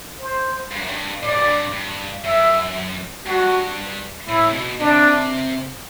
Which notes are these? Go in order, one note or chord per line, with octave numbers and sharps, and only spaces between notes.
C5
G2
F#2
G2
A2 D5
G2
F#2
G2
G2
F#2 E5
G2 F#4
A2 E4
C3
B2
C3 D4